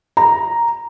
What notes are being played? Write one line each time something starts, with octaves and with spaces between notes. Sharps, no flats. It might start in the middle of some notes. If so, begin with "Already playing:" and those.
A#5